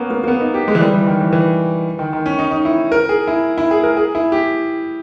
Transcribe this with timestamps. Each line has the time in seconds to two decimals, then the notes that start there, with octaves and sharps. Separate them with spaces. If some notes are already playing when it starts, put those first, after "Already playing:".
Already playing: A#3 B3 C#4
0.11 A#3
0.24 A#3
0.28 B3
0.41 D#4
0.54 G4
0.68 G#3
0.75 E3
0.81 G3
0.93 E3
1.07 D#3
1.20 E3
1.33 E3
1.99 D#3
2.13 D#3
2.26 C#4
2.39 D#4
2.51 D#4
2.65 E4
2.92 A#4
3.09 G#4
3.27 E4
3.58 E4
3.71 G#4
3.84 A#4
3.97 G#4
4.15 E4
4.32 G4